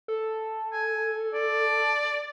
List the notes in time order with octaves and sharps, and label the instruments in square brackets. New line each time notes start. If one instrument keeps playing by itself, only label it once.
[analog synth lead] A4
[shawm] G#5
D5